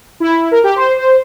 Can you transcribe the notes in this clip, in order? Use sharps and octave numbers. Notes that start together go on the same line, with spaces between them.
E4
A#4
G4
C5
C5